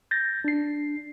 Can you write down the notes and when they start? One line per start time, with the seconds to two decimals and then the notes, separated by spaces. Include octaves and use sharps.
0.11 G6 A6 A#6
0.44 D4 C7